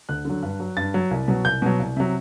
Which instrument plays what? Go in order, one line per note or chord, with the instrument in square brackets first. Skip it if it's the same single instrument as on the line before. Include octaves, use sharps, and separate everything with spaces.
[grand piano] D2 F#6
D3 F#3
G2
F#3
G2 A6
F#3
C2
B2 F#3
C2 G6
B2 F#3
C2
C3 F#3